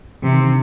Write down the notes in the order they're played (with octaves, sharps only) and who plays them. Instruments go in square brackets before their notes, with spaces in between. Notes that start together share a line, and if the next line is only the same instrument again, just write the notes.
[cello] C3 [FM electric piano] E3
[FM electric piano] D#3
D3